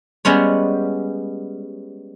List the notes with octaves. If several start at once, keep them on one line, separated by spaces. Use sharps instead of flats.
G3 G#3 B3 C#4 C#5